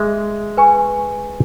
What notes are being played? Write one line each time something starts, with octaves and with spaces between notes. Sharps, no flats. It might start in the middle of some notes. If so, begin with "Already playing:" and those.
Already playing: G#3 G#4 E5
B4 G#5 C#6